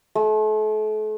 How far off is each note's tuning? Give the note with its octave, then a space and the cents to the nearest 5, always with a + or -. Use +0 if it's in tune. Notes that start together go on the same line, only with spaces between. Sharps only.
A3 -40